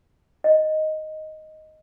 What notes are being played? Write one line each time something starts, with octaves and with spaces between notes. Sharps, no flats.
D#5